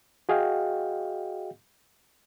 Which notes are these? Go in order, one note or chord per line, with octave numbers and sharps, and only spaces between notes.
F#4 G#4 D#5 F5 G5